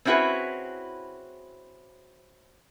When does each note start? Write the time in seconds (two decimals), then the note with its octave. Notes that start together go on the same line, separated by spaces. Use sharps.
0.05 C4 C#4 E4 F#4 G#4 B4